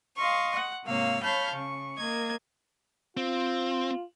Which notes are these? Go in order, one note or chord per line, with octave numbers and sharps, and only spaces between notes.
D#5 F5 C6 C#6
F#5
G#2 C3 A#3 C#5 F5 E6
C#5 F5 A5 B5 F6 G6
C#3 C#6
A#3 D#5 G#6
C4 F4